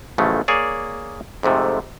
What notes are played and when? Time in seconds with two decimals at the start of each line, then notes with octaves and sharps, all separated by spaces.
0.18 A1 C#3 F3 F#3 A3
0.48 A#3 G#4 C#5 D5
1.43 F2 G#2 C3 A3